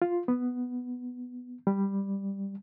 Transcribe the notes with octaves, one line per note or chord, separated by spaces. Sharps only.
F4
B3
G3